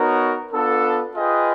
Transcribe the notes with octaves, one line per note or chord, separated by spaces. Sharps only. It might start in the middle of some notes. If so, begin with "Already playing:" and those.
Already playing: B3 D#4 F#4 A#4 C#5
B3 D4 F4 A4
F4 G#4 B4 D#5 G5